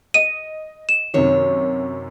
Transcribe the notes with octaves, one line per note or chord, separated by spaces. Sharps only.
D#5 D#7
E7
F#2 C3 D#3 F#3 C#5